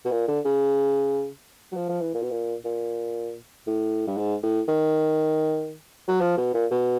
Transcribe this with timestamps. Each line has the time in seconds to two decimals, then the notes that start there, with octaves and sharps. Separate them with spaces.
0.05 B2
0.11 A#2
0.28 D3
0.45 C#3
1.72 F#3
1.76 F3
1.89 F3
2.01 E3
2.14 A#2
2.23 B2
2.31 A#2
2.65 A#2
3.67 A2
4.07 G2
4.18 G#2
4.43 A2
4.68 D#3
6.08 F#3
6.21 F3
6.37 B2
6.54 A#2
6.71 B2